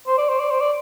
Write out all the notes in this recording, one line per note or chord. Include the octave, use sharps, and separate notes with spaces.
C5
D5
C5
D5
C5
D5